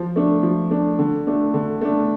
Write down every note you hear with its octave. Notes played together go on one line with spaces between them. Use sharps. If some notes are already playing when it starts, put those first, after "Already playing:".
Already playing: F3
A3 D4
F3
A3 D4
D3
A3 D4
D3
A3 D4